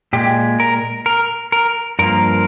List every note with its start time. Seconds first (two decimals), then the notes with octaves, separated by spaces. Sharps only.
0.13 A#2 G#3 G4
0.60 A#4
1.06 A#4
1.52 A#4
1.99 G2 F3 A#3 A#4